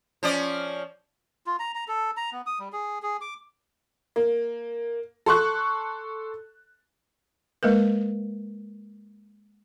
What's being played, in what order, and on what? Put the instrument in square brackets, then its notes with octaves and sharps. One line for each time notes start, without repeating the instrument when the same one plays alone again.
[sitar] F3 C#4 D5
[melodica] F4
A#5
A#5
A4
A#5
B3
D#6
G3
G#4
G#4
D6
[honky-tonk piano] A#3
A4 C6 C#6 F#6
[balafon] G#3 A#3 A#4 B4